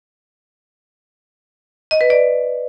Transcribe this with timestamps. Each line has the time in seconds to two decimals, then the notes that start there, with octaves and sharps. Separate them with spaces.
1.91 D#5
2.01 B4
2.10 D5